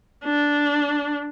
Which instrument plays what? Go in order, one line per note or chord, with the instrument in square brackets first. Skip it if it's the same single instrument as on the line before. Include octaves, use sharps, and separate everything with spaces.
[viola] D4